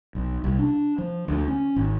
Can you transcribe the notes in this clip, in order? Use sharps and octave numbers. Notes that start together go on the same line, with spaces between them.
B1
C2
D4
F3
D2
C#4
G#1